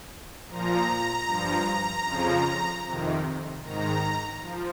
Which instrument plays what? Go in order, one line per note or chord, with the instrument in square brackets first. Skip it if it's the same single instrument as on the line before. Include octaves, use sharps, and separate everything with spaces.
[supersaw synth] A#2 F3 A#5
G2 F3
F2 C#3 F3
F2 C3 D#3
G#2 D#3 A#5
F3